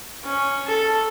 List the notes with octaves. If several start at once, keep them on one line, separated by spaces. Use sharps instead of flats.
C#4
A4